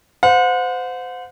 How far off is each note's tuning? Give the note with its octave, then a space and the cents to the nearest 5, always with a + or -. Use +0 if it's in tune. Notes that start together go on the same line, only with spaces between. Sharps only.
C5 -30 F#5 -40